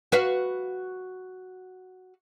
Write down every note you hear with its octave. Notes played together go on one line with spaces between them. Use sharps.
F#4 B4 F5